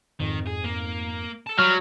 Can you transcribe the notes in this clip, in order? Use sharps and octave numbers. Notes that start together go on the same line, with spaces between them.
F2 G#2 D#3
G#4
A#3
A4 A5
F#3 G3 F6